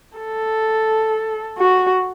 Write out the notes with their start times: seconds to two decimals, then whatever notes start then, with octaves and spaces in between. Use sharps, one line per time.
0.18 A4
1.58 F#4